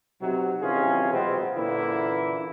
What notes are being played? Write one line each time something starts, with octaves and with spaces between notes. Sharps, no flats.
B1 C3 F#3
C3 D#3 E3 C#4 F4 G#4
B2 F#3 G#3 B3 C4
A#2 D3 E3 A#3 C#4 E4